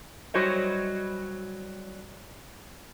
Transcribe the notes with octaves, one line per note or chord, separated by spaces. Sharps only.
F#3 G3 F#4 C5 C#5 D#5